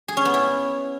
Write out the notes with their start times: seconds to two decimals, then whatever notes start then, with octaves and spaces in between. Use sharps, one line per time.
0.08 G#4
0.17 C#4
0.25 B3
0.34 E4